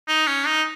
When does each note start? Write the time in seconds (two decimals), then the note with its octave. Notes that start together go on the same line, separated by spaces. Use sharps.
0.08 D#4
0.27 C#4
0.47 D#4